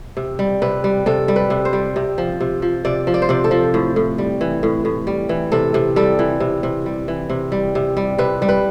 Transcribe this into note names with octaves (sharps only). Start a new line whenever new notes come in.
C3
G3
C3 B4
G3
C3 A4
G3
B4
C3
C5
G3
C3
F3
C3
F3
C3 D5
F3
D5
C5
C3 D5
A4
F3
A2
A2
G3
E3
A2
A2
G3
E3
C3 A4
C3
G3 A4
E3
C3
C3
G3
E3
C3
G3
C3
G3
C3 B4
G3
B4